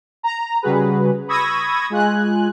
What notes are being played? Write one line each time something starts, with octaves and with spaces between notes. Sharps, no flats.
A#5
C#3 G3 F#4 G#4 B4
B5 C#6 D#6 E6 G#6 A#6
G#3 F4 G#5 F#6